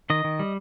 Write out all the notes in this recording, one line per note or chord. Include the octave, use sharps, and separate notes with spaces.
D#3 D#5
D#3
G3